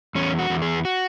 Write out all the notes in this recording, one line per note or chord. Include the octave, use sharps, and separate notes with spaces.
E2 C#4
F#4
E2
G#4
F#4